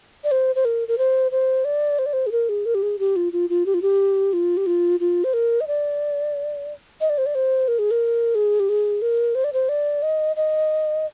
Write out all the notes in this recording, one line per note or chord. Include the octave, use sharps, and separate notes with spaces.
D5
C5
C5
A#4
A#4
C5
C5
D5
C5
D5
C5
G#4
A#4
G#4
A#4
G4
G#4
G4
F4
F4
F4
G4
F4
G4
F4
G4
F4
F4
C5
A#4
D#5
D5
D#5
D5
C5
D5
C5
A#4
G#4
A#4
G#4
G4
G#4
A#4
C5
D5
C5
D5
D#5
D#5